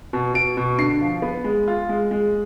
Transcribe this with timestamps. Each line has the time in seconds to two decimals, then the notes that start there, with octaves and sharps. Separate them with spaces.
0.13 B2
0.34 B2 D7
0.57 B2
0.78 D3 C7
1.01 F3
1.22 B3
1.44 G#3
1.68 F4
1.89 G#3
2.11 G#3